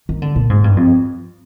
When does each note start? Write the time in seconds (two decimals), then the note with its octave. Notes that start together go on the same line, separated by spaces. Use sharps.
0.09 D#3
0.22 D3
0.36 A#2
0.50 G#2
0.64 G2
0.77 F2